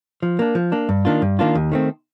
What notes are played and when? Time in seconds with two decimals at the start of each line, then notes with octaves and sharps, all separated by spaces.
0.23 F3
0.39 A#3 D4
0.55 F3
0.72 A#3 D4
0.89 G2
1.05 D#3 A#3 D4 F4
1.22 G2
1.39 D#3 A#3 D4 F4
1.55 D#2
1.72 D#3 A3 C4